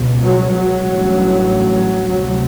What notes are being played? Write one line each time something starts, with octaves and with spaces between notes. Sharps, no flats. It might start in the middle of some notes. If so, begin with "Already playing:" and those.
Already playing: C#2 B2
F#3
F#3
A1 G2
D2 C3 F#3